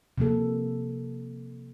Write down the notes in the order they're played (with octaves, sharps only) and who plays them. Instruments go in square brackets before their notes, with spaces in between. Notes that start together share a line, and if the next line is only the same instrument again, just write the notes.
[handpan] C3 F3 A#3 A4